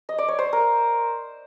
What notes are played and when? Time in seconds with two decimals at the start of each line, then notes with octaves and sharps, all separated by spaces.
0.09 D#5
0.18 D5
0.28 C#5
0.39 C5
0.53 A#4